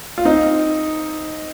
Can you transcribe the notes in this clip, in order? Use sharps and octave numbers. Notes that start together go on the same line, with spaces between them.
F4
C4 D#4